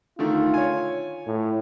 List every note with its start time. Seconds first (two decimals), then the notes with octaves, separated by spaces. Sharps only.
0.19 D3 D#3 A3 F4
0.54 C#5 G#5
1.27 A2